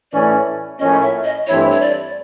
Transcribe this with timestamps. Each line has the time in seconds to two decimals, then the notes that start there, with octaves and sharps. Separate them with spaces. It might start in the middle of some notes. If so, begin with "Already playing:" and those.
0.12 A2 E3 A3 C#4 D5
0.79 A2 F3 A#3 C#4 D#5
1.02 E5
1.24 D#5
1.47 G2 E3 A3 C4 E4 C#5
1.72 C#5
1.81 D5